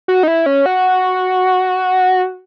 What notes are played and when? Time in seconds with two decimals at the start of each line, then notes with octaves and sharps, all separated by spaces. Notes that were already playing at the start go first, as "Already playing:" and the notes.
0.08 F#4
0.23 D#4
0.28 E4
0.46 C#4
0.66 F#4